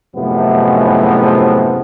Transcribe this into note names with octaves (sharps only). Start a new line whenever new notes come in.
F#2 A2 C3 F3 G#3 B3